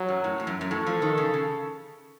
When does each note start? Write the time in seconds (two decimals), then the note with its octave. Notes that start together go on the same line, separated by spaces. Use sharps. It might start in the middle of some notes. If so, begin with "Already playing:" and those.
Already playing: F#3
0.08 F#2
0.24 A2
0.40 A2
0.47 F#2
0.61 F#2
0.71 A2 A4
0.86 F3
1.02 D#3
1.18 C#3
1.34 C#3